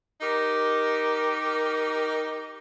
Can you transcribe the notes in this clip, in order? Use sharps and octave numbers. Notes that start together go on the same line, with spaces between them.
D#4 G4 A#4